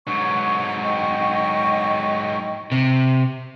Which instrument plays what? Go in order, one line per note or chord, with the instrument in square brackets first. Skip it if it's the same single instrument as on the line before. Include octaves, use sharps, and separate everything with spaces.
[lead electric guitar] G#2 F#3 [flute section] C#6
[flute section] D#5 G5 C#6
[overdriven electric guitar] C3